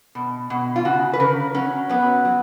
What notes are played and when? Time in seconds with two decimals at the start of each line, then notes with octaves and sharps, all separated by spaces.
0.15 B2
0.50 B2
0.76 F4
0.85 C#3 F#4
1.13 B4
1.20 C#3 A#4
1.54 F#3 C#4
1.89 F#3 B3
2.25 F#3